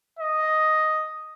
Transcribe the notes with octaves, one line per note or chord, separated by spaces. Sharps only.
D#5